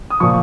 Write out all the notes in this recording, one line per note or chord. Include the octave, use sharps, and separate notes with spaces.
D#6
A#2 F3 C#6